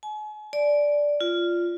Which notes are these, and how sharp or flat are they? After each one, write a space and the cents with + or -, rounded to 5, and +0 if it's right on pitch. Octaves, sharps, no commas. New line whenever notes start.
G#5 +40
D5 -5
F4 -5